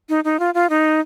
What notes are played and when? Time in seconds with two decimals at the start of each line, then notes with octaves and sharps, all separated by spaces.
0.09 D#4
0.24 D#4
0.40 F4
0.54 F4
0.69 D#4